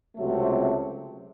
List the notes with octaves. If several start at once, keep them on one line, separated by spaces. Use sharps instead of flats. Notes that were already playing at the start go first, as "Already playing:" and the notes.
C#2 C3 F#3 A3